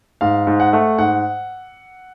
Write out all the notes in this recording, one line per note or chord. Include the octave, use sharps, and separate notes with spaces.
G#2 F5
G#2
F#5
A3
G#2 F#5